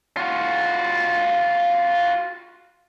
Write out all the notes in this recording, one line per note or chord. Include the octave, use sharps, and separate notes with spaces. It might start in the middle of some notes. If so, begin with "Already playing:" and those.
F4 F#4